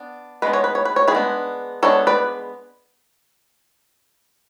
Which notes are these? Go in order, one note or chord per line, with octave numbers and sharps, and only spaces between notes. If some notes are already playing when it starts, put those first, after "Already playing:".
Already playing: B3 D4
G#3 B3 D4 B4
C#5
B4
C#5
B4
C#5
G#3 B3 D4 G#4 B4
G#3 B3 D4 A4 C#5
B4 D5